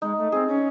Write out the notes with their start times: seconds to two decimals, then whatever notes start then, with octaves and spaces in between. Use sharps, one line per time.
0.02 G#3 D#4
0.17 A3
0.32 C4 G#4
0.48 C#4